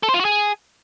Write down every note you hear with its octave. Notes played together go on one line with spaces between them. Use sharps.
A4
C5
F4
F#4
G#4